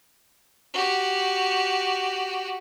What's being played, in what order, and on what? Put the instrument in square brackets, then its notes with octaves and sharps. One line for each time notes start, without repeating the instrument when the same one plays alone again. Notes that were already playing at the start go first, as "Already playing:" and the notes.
[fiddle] F#4 G4